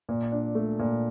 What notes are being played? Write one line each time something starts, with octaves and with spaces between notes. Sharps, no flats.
A#2
D4
A3
A#2